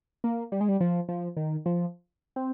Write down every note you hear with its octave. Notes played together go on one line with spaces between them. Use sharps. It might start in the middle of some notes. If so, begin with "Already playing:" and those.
A#3
G3
G#3
G3
F3
F3
D#3
F3
C4